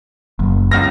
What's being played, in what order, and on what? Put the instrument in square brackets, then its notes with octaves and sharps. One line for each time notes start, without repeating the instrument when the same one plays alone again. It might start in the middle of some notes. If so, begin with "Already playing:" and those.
[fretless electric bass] F#1
[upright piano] C#2 F6 A#6